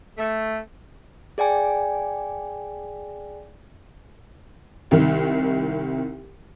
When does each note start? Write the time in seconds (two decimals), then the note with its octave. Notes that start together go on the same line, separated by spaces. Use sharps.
0.18 A3
1.38 G#4 D5 G5 G#5
4.91 C2 D#3